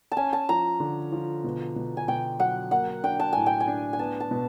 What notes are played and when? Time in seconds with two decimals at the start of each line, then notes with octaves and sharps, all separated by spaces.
0.12 A5
0.17 C#4 G#5
0.33 A5
0.49 F3 A#5
0.80 D3
1.12 F3
1.44 B2
1.76 B2
1.97 G#5
2.08 B2 G5
2.40 F#3 F#5
2.71 A#3 F#5
3.04 D4 G5
3.20 A5
3.33 A2 G#5
3.46 G5
3.60 G#5
3.68 D4
3.93 G#5
3.99 B3 A5
4.20 A5
4.31 B2